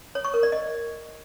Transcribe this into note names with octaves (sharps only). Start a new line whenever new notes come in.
C#5
C#6
A#4
D5
D#5